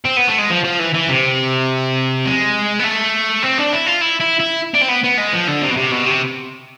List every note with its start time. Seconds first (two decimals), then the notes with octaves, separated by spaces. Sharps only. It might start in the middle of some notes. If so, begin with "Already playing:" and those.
0.05 C4
0.17 B3
0.28 A3
0.38 G#3
0.50 F3
0.64 F3
0.79 E3
0.94 E3
1.08 C3
2.25 G#3
2.80 B3
2.84 A3
3.43 C4
3.58 D4
3.72 E4
3.86 F4
4.01 E4
4.21 E4
4.40 E4
4.75 D4
4.82 C4
4.89 B3
5.04 B3
5.18 G#3
5.33 F3
5.48 D3
5.62 C3
5.70 B2
5.77 C3
5.91 B2
6.06 C3